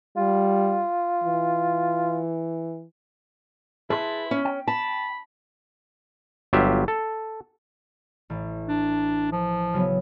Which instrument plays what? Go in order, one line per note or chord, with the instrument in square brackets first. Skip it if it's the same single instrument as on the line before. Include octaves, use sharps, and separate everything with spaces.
[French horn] G3 [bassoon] F4
[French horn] E3
[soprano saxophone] E4 [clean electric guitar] G#4 B4 C6 [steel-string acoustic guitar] A5
[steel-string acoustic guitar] C#4
[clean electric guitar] G5
[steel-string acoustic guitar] A5 [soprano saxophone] B5
[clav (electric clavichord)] G1 F#3 F4 G4 E5
A4
[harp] A1
[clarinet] D4
F3
[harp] C#3 F#3 B3